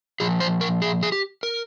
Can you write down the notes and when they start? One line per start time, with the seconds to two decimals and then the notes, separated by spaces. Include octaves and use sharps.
0.20 A#2 F3 G#4
0.40 C5
0.61 A#4
0.82 G#4
1.03 G#4
1.12 G4
1.43 A#4